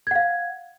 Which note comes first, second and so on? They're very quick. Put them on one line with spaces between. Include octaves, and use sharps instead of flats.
G#6 F#5 F5